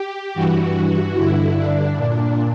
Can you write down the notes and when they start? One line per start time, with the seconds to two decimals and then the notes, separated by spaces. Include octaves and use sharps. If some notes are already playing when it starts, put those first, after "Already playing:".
Already playing: G4
0.34 G2 E3 F#4
1.15 G2 D3 E4
1.56 D4
1.97 A#2